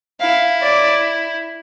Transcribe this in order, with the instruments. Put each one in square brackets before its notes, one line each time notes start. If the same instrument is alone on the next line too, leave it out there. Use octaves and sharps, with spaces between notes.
[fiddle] E4 [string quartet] F5
[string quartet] D5